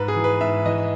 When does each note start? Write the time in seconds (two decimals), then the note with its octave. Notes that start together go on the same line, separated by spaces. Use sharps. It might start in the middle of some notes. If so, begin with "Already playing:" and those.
Already playing: G#2 B4
0.08 G#4
0.16 E3
0.24 B4
0.40 G#2 E5
0.66 E3 D#5